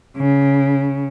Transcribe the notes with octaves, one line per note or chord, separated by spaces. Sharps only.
C#3